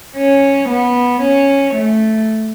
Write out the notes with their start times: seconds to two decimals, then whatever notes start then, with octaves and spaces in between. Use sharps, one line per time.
0.17 C#4
0.69 B3
1.22 C#4
1.74 A3